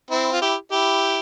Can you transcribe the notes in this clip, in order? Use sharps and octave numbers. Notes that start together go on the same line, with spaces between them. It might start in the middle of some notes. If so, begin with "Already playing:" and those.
C4 E4
F4
E4 G4
E4 G4